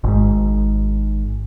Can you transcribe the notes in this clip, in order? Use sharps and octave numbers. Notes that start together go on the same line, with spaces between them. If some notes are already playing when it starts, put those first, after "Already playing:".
G#1 G#2